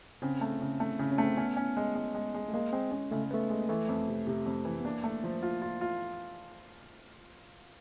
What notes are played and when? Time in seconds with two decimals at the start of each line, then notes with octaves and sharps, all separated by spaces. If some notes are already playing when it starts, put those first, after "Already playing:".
0.22 C#3 C4
0.41 A3
0.61 C#3
0.80 A3
0.99 C#3
1.12 C#4
1.18 A3
1.25 C4
1.37 B3 C#4
1.56 C#4
1.77 G#3
1.95 G#3
2.14 G#3
2.34 G#3
2.49 A3
2.54 G#3 A#3
2.73 G#3 C4
2.92 G#3 C#4
3.11 C#3 A3
3.31 A3 B3
3.50 G#3
3.59 A#3
3.69 E3 A3
3.89 F2
4.08 C3
4.27 C3
4.46 F2
4.65 E3
4.80 B3
4.85 A#3 D4
5.04 A3
5.24 F3
5.43 F4
5.62 F4
5.81 F4